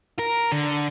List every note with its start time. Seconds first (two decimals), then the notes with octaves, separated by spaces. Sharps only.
0.19 A#4
0.52 D3